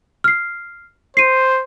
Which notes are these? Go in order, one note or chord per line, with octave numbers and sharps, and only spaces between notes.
F6 C7
C5 C7 D#7